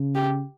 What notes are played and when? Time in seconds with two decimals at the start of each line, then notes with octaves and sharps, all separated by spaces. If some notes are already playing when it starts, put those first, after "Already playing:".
Already playing: C#3
0.15 G4